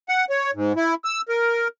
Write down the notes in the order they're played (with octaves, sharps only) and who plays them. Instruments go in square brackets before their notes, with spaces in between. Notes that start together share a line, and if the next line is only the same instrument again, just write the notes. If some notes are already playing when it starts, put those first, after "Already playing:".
[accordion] F#5
C#5
G#2
E4
E6
A#4